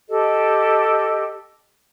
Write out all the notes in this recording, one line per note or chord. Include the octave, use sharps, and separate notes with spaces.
G4 A4 D#5